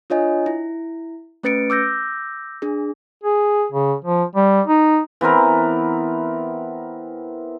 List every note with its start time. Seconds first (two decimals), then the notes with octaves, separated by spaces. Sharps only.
0.10 D4 F4 C#5 D#5 G#5
0.46 E4
1.43 A3 C#4 B4 A6 C#7 D7
1.70 D6 E6 G6 A#6
2.62 D4 G#4
3.24 G#4
3.72 C#3
4.04 F3
4.35 G3
4.67 D#4
5.21 E3 B3 C4 A#4